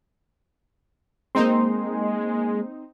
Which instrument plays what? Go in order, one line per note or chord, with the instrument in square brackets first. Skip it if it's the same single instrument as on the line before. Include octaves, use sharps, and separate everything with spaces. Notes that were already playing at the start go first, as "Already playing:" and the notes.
[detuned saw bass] G#3 [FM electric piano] A#3 C6 [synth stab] C4 D#4 C5